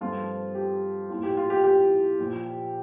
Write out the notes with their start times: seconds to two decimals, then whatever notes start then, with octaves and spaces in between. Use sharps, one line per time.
0.01 G2 F3 A3 C4 F4
0.55 G4
1.09 A#1 A2 F3 F4
1.23 G4
1.37 F4
1.50 G4
1.64 G4
2.19 A#1 A#2 F3